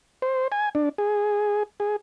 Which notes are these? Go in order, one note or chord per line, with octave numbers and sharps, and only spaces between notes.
C5
G#5
D4
G#4
G#4